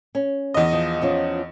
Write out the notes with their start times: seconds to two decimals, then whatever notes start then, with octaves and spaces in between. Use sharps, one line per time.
0.15 C#4
0.54 E2 D#5
0.73 F3
1.02 F3 C#4 F4